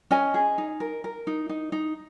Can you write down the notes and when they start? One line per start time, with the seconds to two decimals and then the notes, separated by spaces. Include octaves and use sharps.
0.11 C#4 D#5 G#5
0.34 G#4
0.58 D#4
0.80 A#4
1.04 A#4
1.27 D#4
1.49 D#4
1.72 D#4